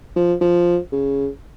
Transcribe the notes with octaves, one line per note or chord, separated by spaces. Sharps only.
F3
F3
C#3